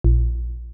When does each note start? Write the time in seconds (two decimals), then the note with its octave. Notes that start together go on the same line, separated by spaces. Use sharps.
0.04 A#1